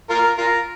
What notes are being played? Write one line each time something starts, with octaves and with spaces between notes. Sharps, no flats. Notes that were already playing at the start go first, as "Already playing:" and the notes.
F4 A#4
F4 A#4